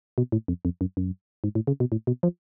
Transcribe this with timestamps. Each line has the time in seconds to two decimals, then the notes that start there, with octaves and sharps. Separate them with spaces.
0.18 B2
0.32 A2
0.48 F2
0.65 F2
0.81 F#2
0.97 F#2
1.44 G#2
1.55 A2
1.67 C#3
1.80 B2
1.92 A2
2.07 B2
2.23 F3